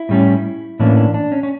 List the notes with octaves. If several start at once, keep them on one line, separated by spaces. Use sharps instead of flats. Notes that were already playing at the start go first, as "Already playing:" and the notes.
Already playing: E4
A2 G3 C#4
A2 E3 A#3 C#4 D4
D4
D4
C#4
C#4